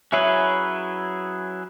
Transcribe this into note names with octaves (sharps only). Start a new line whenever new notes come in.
F#3 C#4 E4 G#4 B4 C#5 E5